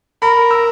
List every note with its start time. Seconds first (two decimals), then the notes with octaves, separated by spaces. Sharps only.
0.22 A#4 B5
0.51 E6